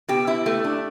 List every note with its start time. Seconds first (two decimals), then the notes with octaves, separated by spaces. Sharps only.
0.09 B2 G4
0.27 E4
0.46 A3
0.64 D4